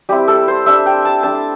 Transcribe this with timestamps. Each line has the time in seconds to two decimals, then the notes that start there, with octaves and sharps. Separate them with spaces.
0.09 G3 C4 E4 G4
0.28 A4
0.48 C5
0.66 G3 D4 E5
0.86 G5
1.05 A5
1.23 A3 D4 A5